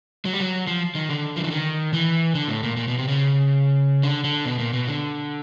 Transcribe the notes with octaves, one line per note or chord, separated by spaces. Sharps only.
F#3
G3
F#3
F3
D#3
D3
F3
E3
D#3
E3
D3
A2
A#2
A#2
B2
C3
C#3
D3
D3
B2
A#2
B2
D3